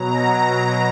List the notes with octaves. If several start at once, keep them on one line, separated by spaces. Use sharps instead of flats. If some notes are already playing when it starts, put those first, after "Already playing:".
Already playing: B2 F#3 A#5